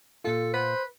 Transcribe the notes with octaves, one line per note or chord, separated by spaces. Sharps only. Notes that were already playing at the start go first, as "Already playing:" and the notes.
A#2 F4 A4
B4 C5